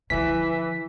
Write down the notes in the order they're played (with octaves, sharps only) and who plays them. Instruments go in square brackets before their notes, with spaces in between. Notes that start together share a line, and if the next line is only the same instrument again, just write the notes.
[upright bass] D3 F3 [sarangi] E3 [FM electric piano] B6